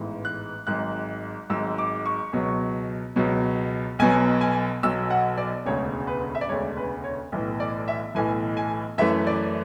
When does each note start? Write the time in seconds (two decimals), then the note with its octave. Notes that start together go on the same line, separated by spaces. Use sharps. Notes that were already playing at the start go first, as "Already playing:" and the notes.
Already playing: A1 G#2 E3 B3
0.25 F#6
0.67 G#1 G#2 F#3 F#6
1.50 G#1 G#2 F#3 E6
1.78 D6
2.06 C#6
2.33 C#2 B2 F#3
3.16 C#2 B2 F#3
3.99 B1 B2 F#3 G#5
4.41 G#5
4.83 B1 B2 F#3 E6
5.10 F#5
5.38 D5
5.66 E1 D2 C#3 G#3 C#5
6.07 B4
6.35 E5
6.41 D5
6.49 E1 D2 C#3 G#3 C#5
6.77 B4
7.04 C#5
7.32 B1 A2 E3
7.60 D5
7.88 E5
8.15 B1 A2 E3 G#5
8.57 G#5
8.98 F#2 E3 A3 C#4 E5
9.27 D5